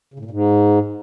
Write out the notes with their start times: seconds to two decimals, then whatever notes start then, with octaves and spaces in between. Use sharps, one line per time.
0.14 C#3
0.19 A2
0.25 A#2
0.31 G#2